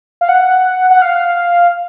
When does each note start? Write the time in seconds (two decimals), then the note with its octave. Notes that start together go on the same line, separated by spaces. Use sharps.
0.21 F5
0.29 F#5
0.90 F#5
1.02 F5